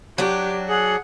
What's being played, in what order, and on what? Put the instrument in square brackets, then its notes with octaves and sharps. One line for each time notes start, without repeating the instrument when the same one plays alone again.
[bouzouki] F#3 D4 [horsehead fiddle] G4
[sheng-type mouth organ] G#4 [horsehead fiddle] F#5